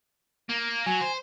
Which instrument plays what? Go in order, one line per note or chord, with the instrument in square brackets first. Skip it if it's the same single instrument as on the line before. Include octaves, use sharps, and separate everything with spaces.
[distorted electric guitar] A#3
[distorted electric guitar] F#3 [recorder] G#5
[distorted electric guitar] C5